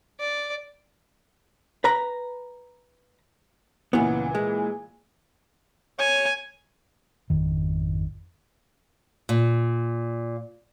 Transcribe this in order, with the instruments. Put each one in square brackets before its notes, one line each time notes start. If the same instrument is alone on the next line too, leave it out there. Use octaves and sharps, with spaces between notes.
[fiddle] D5
[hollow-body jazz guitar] B4 A#5
[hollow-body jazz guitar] C#2 B3 [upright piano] A#2 E3
[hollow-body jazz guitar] G#3
[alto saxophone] C#5 [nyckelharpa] G#5
[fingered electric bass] G#1 F2 D#3
[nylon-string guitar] A#2